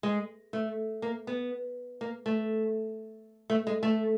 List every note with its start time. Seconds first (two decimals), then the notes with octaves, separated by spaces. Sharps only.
0.03 G#3
0.53 A3
1.02 A#3
1.27 B3
2.01 A#3
2.26 A3
3.50 A3
3.67 G#3
3.83 A3